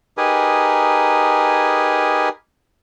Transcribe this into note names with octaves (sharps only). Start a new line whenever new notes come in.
D#4 G4 G#4 A#4 B4 G#5